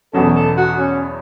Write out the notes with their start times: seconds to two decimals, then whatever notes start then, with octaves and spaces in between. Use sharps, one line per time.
0.13 E2 B2 F#3 C#4 A4
0.36 A4
0.57 F#4
0.79 C#4